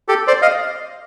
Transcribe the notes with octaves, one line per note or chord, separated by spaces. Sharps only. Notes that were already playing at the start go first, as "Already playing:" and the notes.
G4 A4
C5 D5
D#5 F5